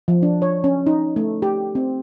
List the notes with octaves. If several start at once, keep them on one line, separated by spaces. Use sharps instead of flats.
F3
D4
C#5
C#4
D#4
A3
G4
C4